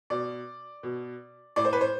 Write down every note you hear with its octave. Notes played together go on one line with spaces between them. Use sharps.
B2 D5
B2
A2 D5
C5
B4
C5